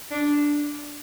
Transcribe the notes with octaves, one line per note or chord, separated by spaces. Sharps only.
D4